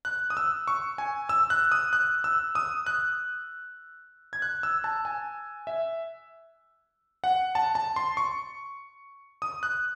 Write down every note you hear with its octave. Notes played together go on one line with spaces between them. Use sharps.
F#6
D#6
E6
C#6
G#5
E6
F#6
D#6
F#6
E6
D#6
F#6
G#6
F#6
E6
A5
G#5
E5
F#5
A5
A5
C6
C#6
D#6
F#6